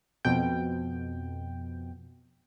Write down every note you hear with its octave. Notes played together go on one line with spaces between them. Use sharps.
F2 B2 G5